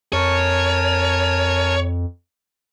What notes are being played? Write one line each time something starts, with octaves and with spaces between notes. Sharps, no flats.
F2 A#4 C#5 G#5 A5